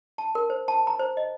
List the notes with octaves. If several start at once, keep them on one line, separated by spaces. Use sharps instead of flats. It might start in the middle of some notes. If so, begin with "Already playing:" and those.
A5
A#4
C5
A5
A#5
C5
D#5